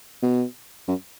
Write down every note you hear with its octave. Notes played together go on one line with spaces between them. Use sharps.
B2
F#2